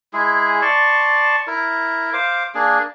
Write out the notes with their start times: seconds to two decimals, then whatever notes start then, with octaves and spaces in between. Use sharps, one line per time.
0.13 G#3 E4 G#4
0.62 D5 A5 C6 C#6
1.47 E4 A#4
2.13 C5 F5 D6
2.55 A#3 D4 G#4